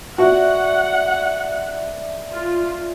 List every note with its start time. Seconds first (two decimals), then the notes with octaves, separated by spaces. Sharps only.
0.18 F#4 D5 E5 F#5
2.32 F4